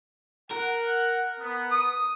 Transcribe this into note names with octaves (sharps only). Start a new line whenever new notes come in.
A#4 F#5
B3
D#6